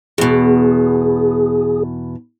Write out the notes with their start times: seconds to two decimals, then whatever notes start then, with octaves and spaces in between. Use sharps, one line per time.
0.18 E2 B2 G#4